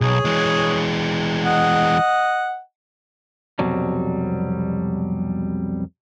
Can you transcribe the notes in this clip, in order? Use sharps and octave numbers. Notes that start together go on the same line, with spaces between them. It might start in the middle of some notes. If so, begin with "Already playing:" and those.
B1 G#4 C#5
E3 G#3
D#5 F#5
C2 F2 B2 F#3 G3